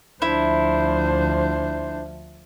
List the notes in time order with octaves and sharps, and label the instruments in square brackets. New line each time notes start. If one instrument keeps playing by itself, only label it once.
[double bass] D2 F3 [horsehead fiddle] D4 C5 [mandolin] E4